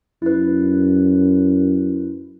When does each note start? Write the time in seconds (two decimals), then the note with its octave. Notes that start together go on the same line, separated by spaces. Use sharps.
0.22 F#2 E4 B4